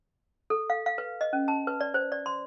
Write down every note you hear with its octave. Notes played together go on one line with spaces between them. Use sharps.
A4
F5
F5
B4
D#5
C#4
A5
B4
D5
C5
D5
C6